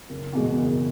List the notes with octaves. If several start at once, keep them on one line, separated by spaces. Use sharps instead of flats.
F#1
E2 B2 G#3
F#1